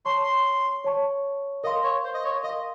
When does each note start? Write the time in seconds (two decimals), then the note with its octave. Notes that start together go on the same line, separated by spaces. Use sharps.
0.05 C#5 A5 C6 C#6
0.24 C6
0.84 C#5 A5 C#6
1.64 A#4 D#5 F5 C6
1.84 C#5
2.04 C5
2.14 D#5
2.24 C#5
2.43 A#4 D#5 F5 C6